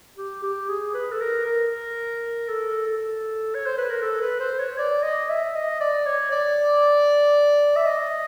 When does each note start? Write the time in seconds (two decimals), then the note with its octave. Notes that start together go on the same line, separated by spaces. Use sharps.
0.17 G4
0.43 G4
0.69 G#4
0.94 B4
1.11 A4
1.20 A#4
1.45 A#4
2.48 A4
2.87 A4
3.54 C#5
3.66 C5
3.78 B4
3.90 A#4
4.01 A4
4.21 B4
4.40 C5
4.59 C#5
4.78 D5
5.03 D#5
5.29 E5
5.55 D#5
5.80 D5
6.06 C#5
6.31 D5
7.76 E5
7.86 D#5